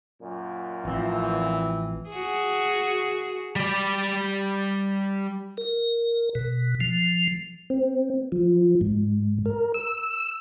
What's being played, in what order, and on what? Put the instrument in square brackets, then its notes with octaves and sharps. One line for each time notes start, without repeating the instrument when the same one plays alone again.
[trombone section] F#2 A#2
[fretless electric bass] A1 F3 [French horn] E3 [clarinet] C4
[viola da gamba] F#4 G#4
[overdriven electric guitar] G3 D5
[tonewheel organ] A#4
B2
F3
C4
F3
G#2
A#4
E6